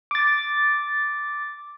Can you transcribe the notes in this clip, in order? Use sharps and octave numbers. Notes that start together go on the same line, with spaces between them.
D6 A6